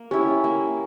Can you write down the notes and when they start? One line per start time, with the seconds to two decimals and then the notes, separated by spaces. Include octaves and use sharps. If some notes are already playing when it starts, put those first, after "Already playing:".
Already playing: A#3
0.11 C#4 E4 G4
0.44 A#3